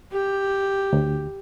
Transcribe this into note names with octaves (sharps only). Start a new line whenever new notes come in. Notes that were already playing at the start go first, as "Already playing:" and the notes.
G4
D2